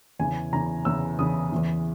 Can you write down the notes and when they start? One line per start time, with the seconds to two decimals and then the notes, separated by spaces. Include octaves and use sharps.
0.19 E2 C#3 E3 G#5
0.53 E2 C#3 E3 A#5
0.85 E2 C#3 E3 E6
1.19 E2 C#3 E3 D#6
1.52 E2 C#3 E3